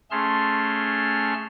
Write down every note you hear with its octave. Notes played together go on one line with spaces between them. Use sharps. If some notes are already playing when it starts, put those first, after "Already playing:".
A3 C#4 G#4 A5 C6 F6